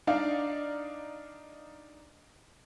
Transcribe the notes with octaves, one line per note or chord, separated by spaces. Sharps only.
D4 D#4 D5 F5